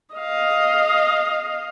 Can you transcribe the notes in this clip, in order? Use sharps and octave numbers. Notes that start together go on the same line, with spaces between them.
D#5 F5